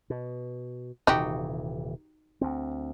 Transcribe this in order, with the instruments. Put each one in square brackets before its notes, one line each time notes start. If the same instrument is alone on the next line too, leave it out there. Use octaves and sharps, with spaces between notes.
[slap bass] B2
[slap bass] D#1 C3 E3 [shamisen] D#4 F#4 G4
[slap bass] D2 C4